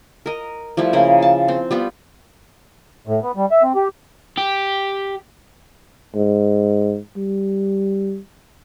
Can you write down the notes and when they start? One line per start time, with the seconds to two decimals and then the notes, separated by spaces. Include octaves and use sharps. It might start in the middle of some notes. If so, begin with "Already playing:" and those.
0.26 A#4 D#5
0.77 F3 G3 A3 E4
0.93 C#3 A#3 A#4
1.22 A5
1.48 C4
1.71 G3 B3 F4
3.07 A2
3.23 B3
3.36 G3
3.51 E5
3.63 C4
3.75 G4
4.37 G4
6.15 G#2
7.17 G3